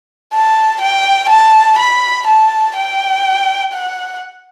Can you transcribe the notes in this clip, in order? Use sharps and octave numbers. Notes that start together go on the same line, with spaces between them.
A5
G5
A5
B5
A5
G5
F#5